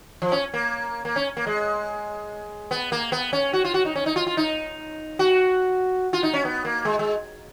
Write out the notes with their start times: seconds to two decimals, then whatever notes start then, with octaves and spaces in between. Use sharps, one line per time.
0.22 F3
0.32 C#4
0.54 A#3
1.05 A#3
1.16 C#4
1.37 A#3
1.47 G#3
2.71 B3
2.92 A#3
3.12 B3
3.33 C#4
3.53 F#4
3.64 F4
3.74 F#4
3.85 D#4
3.95 C#4
4.06 D#4
4.16 F4
4.27 F4
4.37 D#4
5.19 F#4
6.13 F4
6.23 D#4
6.34 C#4
6.45 B3
6.65 A#3
6.85 G#3
6.99 G#3